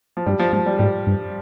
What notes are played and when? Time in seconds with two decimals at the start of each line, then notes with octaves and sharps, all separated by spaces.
0.17 F3
0.26 G2 G3
0.39 F3
0.53 G#2 F3
0.66 G3
0.79 G#2 G3
1.07 G2